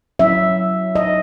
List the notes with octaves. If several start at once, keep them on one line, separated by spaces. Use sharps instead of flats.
F#3 C#4 E4 E5
D#5